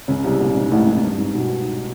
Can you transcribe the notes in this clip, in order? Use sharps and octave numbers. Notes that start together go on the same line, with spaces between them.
C#2 C#3
C2 C3
A#1 A#2
G#2
A1 A2
G#2
G2
G#2
B1 B2